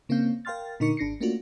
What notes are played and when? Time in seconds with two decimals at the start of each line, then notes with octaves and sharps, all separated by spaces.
0.09 C#3 A#3 C4 C#4 F5 G6
0.45 A#4 F5 G5 C6 F6 A6
0.80 A#2 D3 D#4 A#4 C#6 C#7
0.97 G#1 D4 A#6 C7 C#7
1.21 A3 A#3 C#4 D4 F4 F#4